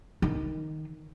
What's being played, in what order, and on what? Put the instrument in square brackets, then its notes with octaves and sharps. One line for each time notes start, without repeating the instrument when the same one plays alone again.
[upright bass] D#3